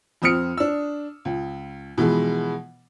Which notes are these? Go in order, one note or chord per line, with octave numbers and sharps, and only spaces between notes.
F2 C4 D#6 F6 C#7
D4 E6
C#2
B2 E3 F3 G#3